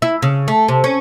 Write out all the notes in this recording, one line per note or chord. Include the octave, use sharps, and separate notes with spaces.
E4
C#3
A3
C3
C#4